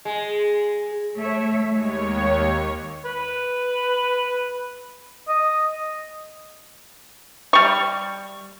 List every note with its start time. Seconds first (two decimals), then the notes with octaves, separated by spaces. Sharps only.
0.05 G#3
1.17 A3 C#5 E5
1.70 D#2 G#3 C#5
3.05 B4
5.28 D#5
7.53 G3 C#6